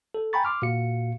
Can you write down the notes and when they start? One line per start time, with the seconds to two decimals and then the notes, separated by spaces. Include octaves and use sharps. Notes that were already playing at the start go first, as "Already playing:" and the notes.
0.14 A4
0.33 G5 G#5 A#5 B5 C#6 A6
0.45 C6 D6 F6
0.62 A#2 F#4 F5 C#7